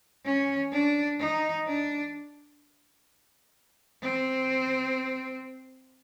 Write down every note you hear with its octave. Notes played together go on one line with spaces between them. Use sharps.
C#4
D4
D#4
D4
C4